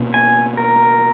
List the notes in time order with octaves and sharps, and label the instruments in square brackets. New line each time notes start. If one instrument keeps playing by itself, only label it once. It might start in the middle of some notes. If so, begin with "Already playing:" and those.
Already playing: [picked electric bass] B2 A#3 C#4
[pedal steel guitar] G#5
A#4